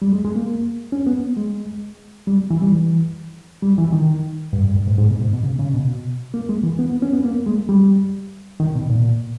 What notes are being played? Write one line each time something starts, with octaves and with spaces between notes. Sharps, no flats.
G3
G#3
G#3
A#3
C#4
B3
G#3
G3
E3
G3
E3
G3
E3
D#3
G2
G2
G2
G#2
G#2
B2
G#2
B2
C#3
C#3
B2
A#3
G#3
E3
B3
B3
C#4
B3
A#3
G#3
G3
D#3
B2
A#2